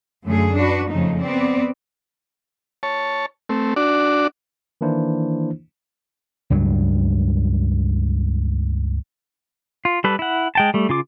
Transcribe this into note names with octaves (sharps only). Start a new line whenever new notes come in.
F#2 D3 A3 G#4
D4 F#4 B4
F2 C#3 F3 A3 D#4
B3 C4 D5
C#5 A5
A3 C4
D4 F#4 D5
D#3 E3 A#3 D4 E4 C5
C#2 G2 F#3
F4
G3 A4 B4
E4 F#5
G#3 G5 A5
G3 A3
C#3 F4 D6